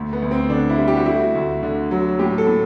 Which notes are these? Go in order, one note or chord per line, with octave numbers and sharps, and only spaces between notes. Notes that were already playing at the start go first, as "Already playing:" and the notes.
Already playing: D2 A3
B3
D2
C4
D3 D4
E4
G3
G4
F#4
A3 E4
F#4
D2
D3
F#3
A2 G4
A4
A2